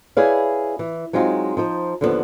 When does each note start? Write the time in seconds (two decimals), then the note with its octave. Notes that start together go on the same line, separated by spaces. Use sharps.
0.17 E4 G#4 B4 C#5 D5 F5
0.79 E3
1.13 F#3 G#3 C4 D#4 F4
1.57 F3 D#4 C5
2.01 D#2 D3 F3 G3 B3 D4